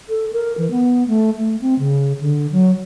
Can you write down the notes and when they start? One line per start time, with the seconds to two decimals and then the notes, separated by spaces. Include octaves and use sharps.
0.09 A4
0.33 A#4
0.58 E3
0.71 B3
1.08 A3
1.37 A3
1.61 C4
1.79 C#3
2.21 D3
2.52 F#3